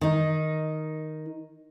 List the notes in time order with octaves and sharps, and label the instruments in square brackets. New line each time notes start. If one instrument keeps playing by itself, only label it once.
[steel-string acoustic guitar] D#3 D#4